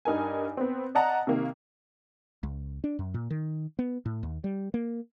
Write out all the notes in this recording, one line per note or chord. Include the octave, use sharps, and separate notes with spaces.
G2 D#4 A#4 G#5
B3 C4
D5 D#5 F#5 A5 A#5
C3 D#3 A#3
C#2
D4
F#2
A#2
D#3
B3
A2
D#2
G3
A#3